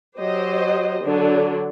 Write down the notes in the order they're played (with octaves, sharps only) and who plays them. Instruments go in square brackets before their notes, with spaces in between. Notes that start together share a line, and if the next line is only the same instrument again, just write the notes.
[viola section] F#3 G4 C5 D#5
D3 F#3 D4